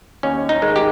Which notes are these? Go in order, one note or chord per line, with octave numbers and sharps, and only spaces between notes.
D#2 C#4
D#4
D#3 G#3
G4